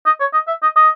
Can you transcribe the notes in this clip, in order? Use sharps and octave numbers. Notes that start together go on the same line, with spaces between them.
D#5
C#5
D#5
E5
D#5
D#5